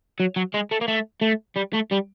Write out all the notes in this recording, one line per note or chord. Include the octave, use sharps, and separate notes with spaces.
F#3
F#3
G#3
A3
A#3
A3
A3
G3
A3
G3